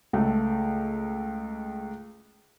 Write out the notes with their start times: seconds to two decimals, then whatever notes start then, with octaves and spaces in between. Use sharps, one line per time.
0.13 C#2 A3